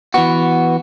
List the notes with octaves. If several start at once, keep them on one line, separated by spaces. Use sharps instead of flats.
E3 B3 F#4